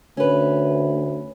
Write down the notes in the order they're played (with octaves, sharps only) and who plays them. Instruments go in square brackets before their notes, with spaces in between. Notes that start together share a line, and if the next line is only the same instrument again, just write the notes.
[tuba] D2 [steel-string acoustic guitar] C#4 B4